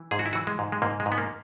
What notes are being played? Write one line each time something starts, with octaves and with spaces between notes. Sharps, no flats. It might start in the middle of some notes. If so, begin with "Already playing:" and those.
Already playing: E3
G#2 G#4
F#4
E4
E3 F#4
G#3
G#2
G#3
G#2 A#3
G#3
G#2
B3
A#3